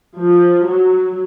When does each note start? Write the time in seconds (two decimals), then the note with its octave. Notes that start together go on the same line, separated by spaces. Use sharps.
0.18 F3
0.66 F#3